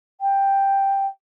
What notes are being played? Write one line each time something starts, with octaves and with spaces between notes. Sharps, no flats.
G5